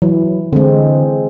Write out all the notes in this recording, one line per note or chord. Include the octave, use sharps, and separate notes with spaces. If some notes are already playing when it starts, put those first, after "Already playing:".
E3 F#3
D3 G#3 C4